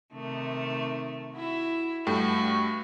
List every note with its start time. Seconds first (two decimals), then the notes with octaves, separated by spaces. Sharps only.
0.13 C3 D#3 A3
1.35 E4 F#4 E5
2.07 G2 A3 F#4 G5